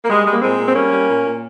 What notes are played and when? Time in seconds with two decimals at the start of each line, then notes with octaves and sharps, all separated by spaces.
0.04 A#3
0.08 G3 G#3
0.25 G3 G#3
0.34 A#3
0.42 A#2 G#3 C4
0.58 A#2
0.68 C4
0.75 G3 A#3 C#4
0.92 G3
1.08 A#2
1.24 A#2